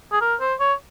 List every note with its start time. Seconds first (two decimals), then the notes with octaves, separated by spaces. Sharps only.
0.12 G#4
0.21 A#4
0.41 C5
0.60 C#5